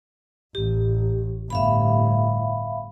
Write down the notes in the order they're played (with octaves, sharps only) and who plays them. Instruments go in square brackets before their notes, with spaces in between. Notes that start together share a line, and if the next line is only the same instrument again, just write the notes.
[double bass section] A1 [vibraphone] G4
[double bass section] G1 A2 [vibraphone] E5 F5 B5